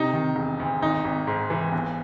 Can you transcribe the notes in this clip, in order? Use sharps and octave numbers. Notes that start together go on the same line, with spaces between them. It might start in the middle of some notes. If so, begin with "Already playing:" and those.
Already playing: C3 D#4
D#3
E1
D2
G#1 D#4
G#1
G#2
E3
G1